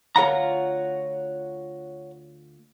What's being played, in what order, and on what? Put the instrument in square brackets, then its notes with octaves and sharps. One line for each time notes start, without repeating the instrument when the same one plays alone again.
[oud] D2 F4 A#4 [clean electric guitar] C#5 F#5 A#5